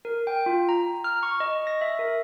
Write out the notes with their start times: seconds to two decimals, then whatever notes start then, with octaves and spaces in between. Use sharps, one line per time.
0.05 A#4
0.27 G5
0.46 F4
0.69 A#5
1.04 F6
1.23 C#6
1.40 D#5
1.67 A#6
1.81 E5
1.99 A#4